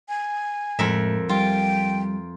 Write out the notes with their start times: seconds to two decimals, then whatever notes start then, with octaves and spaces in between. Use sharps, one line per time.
0.09 G#5
0.79 F2 A2 G#3 A#4 E5
1.29 G3 F4 G5